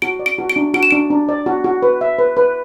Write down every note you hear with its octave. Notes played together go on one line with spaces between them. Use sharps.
F#4 D7
D5
D7
F#4
D7
D4
F#4 D7
E7
D4 D7
D4
D5
F#4
F#4
B4
E5
B4
B4